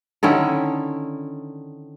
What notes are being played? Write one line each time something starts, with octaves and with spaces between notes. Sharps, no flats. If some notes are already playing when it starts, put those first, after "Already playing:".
D3 D#3 C#4 E4